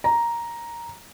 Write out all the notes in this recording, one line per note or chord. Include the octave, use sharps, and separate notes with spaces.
A#5